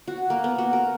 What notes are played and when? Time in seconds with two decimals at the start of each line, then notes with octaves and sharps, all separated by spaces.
0.08 F#4
0.30 A#3
0.44 B3
0.58 F#4
0.73 A#4